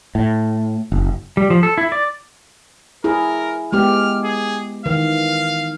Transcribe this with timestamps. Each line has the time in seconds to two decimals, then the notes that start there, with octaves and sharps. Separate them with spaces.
0.15 A2
0.92 F#1
1.37 G3
1.50 F3
1.63 A4
1.78 E4
1.92 D5
3.04 E4 G#4 A#4
3.72 G#3 B3 G4 F6
4.24 G#4
4.86 D#3 E3 F5